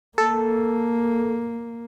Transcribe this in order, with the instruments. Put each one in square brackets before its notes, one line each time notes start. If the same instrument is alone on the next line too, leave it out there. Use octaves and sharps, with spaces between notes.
[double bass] A#3 [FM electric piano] A4